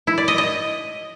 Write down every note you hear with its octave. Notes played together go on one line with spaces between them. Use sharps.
E4
D5
D#5
D#5